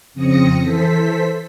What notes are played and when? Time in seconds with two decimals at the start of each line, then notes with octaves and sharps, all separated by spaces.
0.14 F2 C#3 C4 D#6 A#6 C#7
0.62 E3 A4 C5 B6